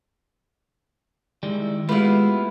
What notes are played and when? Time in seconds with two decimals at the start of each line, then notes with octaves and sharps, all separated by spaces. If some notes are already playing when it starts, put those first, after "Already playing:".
1.43 D#3 G3 G#3 E4
1.89 G#3 A3 B3 E4 F4 G4 B4 F5